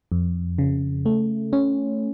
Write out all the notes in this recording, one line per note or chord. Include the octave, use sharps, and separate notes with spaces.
F2
C#3
A3
C#4